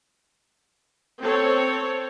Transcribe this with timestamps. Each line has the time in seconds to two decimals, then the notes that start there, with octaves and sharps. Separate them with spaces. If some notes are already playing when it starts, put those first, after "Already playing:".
1.21 C4 A4 C#5